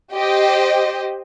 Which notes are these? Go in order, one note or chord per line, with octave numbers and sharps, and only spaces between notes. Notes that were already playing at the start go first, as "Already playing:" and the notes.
G4 C5 D#5